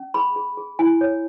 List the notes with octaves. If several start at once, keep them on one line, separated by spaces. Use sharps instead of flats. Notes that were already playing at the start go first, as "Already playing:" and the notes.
Already playing: C#4
G#4 B5
G#4
G#4
E4 G#5
C#5